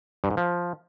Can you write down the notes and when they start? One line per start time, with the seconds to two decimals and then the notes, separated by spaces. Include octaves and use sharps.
0.24 G2
0.30 G#2
0.37 F3